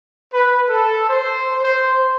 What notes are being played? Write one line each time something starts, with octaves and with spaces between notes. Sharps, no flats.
B4
A4
C5
C5